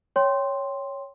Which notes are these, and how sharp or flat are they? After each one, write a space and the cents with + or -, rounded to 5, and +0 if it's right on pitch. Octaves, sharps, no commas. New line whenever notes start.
C#5 +0 G5 +0 C6 +0